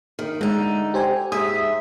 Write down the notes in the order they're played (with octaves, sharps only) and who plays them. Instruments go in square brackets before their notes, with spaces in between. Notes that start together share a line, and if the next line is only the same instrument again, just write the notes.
[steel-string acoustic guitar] D#3
[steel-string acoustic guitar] D3 D#4 [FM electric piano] G#3
[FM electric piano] G4 C5 G#5
[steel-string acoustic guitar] G#2 E5 [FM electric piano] D#6